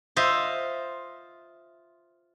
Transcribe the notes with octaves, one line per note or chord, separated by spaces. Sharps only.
F4 C5 D#5 E5